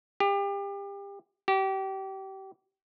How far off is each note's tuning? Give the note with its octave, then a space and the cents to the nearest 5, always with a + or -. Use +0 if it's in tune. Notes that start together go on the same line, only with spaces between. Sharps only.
G4 +30
G4 -30